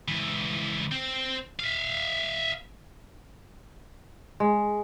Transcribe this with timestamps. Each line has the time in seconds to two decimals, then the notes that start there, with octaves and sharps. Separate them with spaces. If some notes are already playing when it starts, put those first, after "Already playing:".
0.08 C#2 E3
0.92 C4
1.59 E5 F5
4.40 G#3